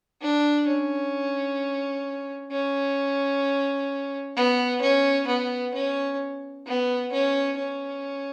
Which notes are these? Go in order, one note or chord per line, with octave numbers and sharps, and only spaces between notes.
D4
C#4
C#4
B3
C#4
B3
C#4
B3
C#4
C#4